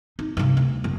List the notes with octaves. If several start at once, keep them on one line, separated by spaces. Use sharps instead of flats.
D#4
G2 C3
D2
F#1